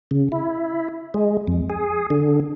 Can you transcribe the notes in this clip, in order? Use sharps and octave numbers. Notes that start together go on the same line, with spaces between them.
C#3
E4
G#3
F2
G#4
D3